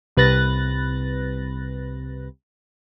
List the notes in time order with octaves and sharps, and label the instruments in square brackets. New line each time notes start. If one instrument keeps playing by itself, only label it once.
[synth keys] C2 C3 B4 F#6 A6 A#6